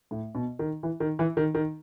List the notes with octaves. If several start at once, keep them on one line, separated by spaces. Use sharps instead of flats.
A2
B2
D#3
E3
D#3
E3
D#3
D#3